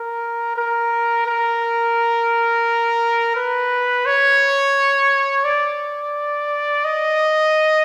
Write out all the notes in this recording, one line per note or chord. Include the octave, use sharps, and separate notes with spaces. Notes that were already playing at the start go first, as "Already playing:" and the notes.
Already playing: A#4
A#4
A#4
B4
C#5
D5
D#5